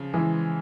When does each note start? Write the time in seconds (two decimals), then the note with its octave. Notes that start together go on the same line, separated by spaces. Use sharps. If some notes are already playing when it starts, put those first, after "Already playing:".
Already playing: C#3 F3
0.13 E3 G#3